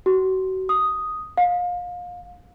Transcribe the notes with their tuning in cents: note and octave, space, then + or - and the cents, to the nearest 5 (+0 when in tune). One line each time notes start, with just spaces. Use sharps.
F#4 +30
D#6 +0
F5 +30